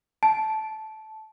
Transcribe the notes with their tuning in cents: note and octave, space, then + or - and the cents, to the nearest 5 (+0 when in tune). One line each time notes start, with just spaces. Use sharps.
A5 -10